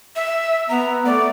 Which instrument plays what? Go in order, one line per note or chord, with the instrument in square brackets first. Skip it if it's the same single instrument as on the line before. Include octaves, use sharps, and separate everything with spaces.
[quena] E5
[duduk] B3 [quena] A#5
[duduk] A3 [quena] D5